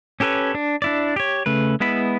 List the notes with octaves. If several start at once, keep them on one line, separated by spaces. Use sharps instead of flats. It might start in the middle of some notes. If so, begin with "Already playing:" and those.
C#4 G4 A4 B4 C#5
D4
D4 E4 D5
G4 C#5
C#3 A3 B4
G#3 B3 E4 B5